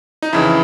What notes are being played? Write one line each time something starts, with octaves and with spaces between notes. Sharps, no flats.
D#4
F2 C#3 E3 E4